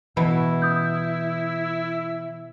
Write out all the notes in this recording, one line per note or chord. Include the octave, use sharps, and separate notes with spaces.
B2 E3 E4 B5
D#6 G6